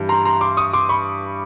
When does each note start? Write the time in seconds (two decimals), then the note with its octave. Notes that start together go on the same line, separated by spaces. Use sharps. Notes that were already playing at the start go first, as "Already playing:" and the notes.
Already playing: G2 E3 G3
0.09 A#5 C6
0.25 A#5 C6
0.41 C6 D6
0.57 C#6 D#6
0.73 C6 D6
0.89 B5 C#6